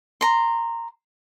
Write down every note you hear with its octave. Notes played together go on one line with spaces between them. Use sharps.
A#5 C6